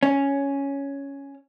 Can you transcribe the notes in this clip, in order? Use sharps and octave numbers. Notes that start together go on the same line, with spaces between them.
C#4